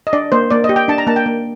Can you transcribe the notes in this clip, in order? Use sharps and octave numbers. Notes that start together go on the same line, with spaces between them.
D#5
D4 D5
A#3 C5
A#3 D5
D#5
G4
G5
D4 A5
A#5
A#3 A5
G5
A#3